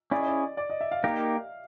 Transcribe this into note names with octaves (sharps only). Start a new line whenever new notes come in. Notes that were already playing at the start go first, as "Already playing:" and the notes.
C#4 E4 G#4 C#5 D5
D#5
D5
D5
D#5
E5
F5
A#3 D#4 G4 A#4 F5